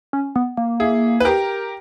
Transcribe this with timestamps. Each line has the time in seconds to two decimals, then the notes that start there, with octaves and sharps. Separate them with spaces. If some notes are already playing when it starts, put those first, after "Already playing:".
0.13 C#4
0.36 B3
0.57 A#3
0.80 E4 G#4
1.20 B4
1.25 G4 A#4